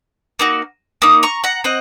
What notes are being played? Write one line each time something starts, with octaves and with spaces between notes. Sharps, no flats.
A#3 D#4 F#4
A#3 D#4 D#6
A#5 C#6
F#5 A#5
C4 D#5 F#5